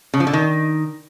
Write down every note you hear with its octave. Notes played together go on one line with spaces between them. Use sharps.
C#3
F3
D3
D#3